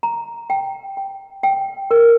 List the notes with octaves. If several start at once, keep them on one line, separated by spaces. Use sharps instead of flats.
A#5
G5
G5
G5
A#4